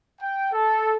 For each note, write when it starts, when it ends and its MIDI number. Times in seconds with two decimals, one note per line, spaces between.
0.21 0.51 79
0.52 0.96 69